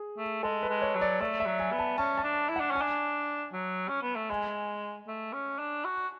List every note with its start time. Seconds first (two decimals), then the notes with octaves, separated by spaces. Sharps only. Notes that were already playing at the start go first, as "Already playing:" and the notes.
Already playing: G#4
0.18 A3
0.43 G#3 A4
0.63 B4
0.69 G#3
0.82 C#5
0.95 F#3
1.01 D5
1.21 A3 D5
1.40 E5
1.46 F#3
1.60 G#5
1.72 B3
1.79 A5
1.98 C#4 A5
2.18 A5
2.24 D4
2.49 E4
2.56 D4 F#5
2.71 C#4 G#5
2.81 D4
3.52 F#3
3.88 C#4
4.02 B3
4.16 A3
4.30 G#3 G#5
5.07 A3
5.33 C#4
5.59 D4
5.85 F#4